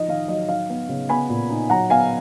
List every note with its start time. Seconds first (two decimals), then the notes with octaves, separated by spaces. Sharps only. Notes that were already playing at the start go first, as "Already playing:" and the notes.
Already playing: F3 D#4 D#5
0.08 D#3 F5
0.28 F#3 D#5
0.48 D#4 F5
0.70 B3
0.89 C#3
1.09 B3 G#5 B5
1.29 A#2
1.49 D#4
1.70 F#3 F#5 A#5
1.90 B3 F5 G#5